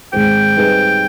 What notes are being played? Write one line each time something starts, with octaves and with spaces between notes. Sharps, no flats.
G#2 D#3 G#3 C4 G5
G3 C4 D#4 G#4 B4